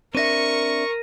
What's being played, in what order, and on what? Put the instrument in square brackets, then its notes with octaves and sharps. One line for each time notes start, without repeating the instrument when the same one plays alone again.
[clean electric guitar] C4 D4 E5 [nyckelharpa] A#4 [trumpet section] C#6 [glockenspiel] A#6 D#7